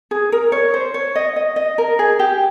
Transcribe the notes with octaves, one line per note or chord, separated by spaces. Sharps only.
G#4
A#4
C#5
C5
C#5
D#5
D#5
D#5
A#4
G#4
G4